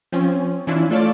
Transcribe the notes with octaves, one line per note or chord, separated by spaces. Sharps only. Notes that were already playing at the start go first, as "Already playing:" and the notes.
F3 C4 C#4
E3 C#4 D4 E4 F4
A3 F4 A4 C#5 D5